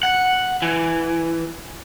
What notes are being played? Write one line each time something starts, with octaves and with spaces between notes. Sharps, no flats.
F#5
E3